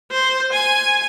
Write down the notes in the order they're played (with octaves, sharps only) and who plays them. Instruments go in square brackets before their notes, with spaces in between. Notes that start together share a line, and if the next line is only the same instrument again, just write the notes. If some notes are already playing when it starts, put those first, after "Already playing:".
[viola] C5
G#5